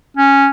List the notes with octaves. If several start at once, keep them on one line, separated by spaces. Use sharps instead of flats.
C#4